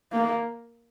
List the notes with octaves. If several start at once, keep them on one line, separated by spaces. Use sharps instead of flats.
A#3